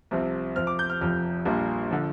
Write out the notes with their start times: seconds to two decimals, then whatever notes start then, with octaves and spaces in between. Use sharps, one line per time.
0.11 C2 C3 F3 C4
0.56 F2 F3 C4 F6
0.67 D6
0.79 G6
0.90 F6
1.01 F1 F2 F3 F6
1.45 A#1 A#2 G3 A#3 D4
1.91 D3 F3